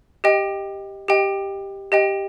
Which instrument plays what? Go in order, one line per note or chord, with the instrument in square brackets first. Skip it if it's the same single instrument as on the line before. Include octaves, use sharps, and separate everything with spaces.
[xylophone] G4 D#5 G5
G4 D#5 G5
G4 D#5 G5